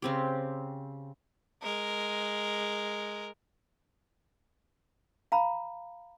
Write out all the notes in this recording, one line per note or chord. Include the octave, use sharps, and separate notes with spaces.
C#3 C4 G4
G#3 A#4
F5 A#5 B5